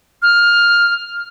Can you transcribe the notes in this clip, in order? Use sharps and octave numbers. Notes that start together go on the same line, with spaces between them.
F6